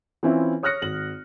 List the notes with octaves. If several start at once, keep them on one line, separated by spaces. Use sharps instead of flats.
E3 C4 C#4 E4 F4
C#5 D#6 F6 F#6 A#6 C#7
G#1 F#7